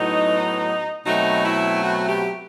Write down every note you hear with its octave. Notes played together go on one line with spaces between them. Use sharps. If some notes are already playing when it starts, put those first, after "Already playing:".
Already playing: A2 F#3 B3 D#4
B2 F#3 A3 C4 D#4
E4
F#4
G4